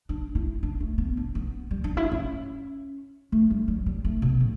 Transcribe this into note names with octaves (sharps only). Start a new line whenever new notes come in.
D4
E4
D4
A3
B3
D4
B3
G3
D4
E4
C#4
A3
G3
F#3
G3
A3
B2
A2